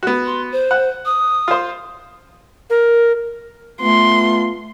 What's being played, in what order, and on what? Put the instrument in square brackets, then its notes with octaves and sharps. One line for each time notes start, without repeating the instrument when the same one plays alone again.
[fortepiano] B3 F#4
[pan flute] C6
C5
[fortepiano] F#5
[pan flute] D#6
[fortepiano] F4 C5
[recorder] A#4
[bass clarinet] A3 [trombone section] B3 F4 [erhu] C6